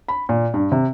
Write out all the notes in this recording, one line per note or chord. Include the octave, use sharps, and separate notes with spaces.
B5
A#2
G2
C3